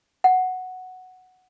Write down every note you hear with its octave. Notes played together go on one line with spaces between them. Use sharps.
F#5